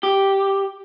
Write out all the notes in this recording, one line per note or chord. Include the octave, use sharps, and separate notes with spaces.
G4